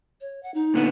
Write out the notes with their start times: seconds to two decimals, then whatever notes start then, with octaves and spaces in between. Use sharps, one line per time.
0.21 C#5
0.43 F#5
0.54 D#4
0.74 A#2 D3 B3